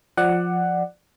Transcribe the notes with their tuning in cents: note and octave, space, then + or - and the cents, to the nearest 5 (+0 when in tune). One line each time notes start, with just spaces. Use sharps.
F3 +10 D5 +15 F#5 +5